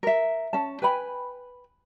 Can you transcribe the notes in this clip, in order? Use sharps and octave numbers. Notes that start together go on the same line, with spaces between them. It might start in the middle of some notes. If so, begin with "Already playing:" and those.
A#4 E5
C#4 A5
B4 G5 G#5 B5